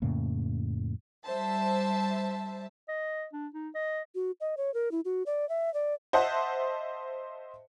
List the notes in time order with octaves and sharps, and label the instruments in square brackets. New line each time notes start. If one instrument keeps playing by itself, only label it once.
[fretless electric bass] F2 A2 C#3 A#3
[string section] G3 C5 E5 A5
[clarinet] D#5
D4
D#4
D#5
[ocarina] F#4
D#5
C#5
A#4
E4
F#4
D5
E5
D5
[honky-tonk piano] C5 D#5 E5 F#5 A5